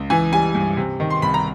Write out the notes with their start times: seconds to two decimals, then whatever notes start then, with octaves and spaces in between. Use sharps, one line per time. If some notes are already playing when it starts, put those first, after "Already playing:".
Already playing: C#2
0.10 E3 G#5
0.32 G3 G#5
0.55 G2
0.77 C3
1.00 D#3
1.10 C6
1.22 C2 B5
1.34 A#5